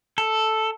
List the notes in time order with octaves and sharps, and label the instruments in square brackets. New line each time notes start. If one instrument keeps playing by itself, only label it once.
[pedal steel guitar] A4